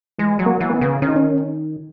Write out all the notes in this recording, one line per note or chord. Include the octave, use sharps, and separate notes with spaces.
E3 G#3
F#3
A#3
E3
A#3
B3
C#3
D#3 C#4
D#4
C#4